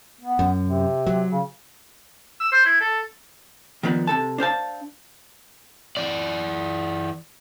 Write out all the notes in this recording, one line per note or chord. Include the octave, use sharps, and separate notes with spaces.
B3
F#2
C3
F#3
C#3
E6
C5
E4
A4
D#3 F3 B3 D4
C3 A4 A5
D4 C5 F5 A5
E3 D5